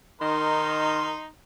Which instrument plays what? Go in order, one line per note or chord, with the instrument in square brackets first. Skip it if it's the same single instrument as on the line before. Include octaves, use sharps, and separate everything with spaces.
[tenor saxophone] D#3 [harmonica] D#4 C6 [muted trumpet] A#4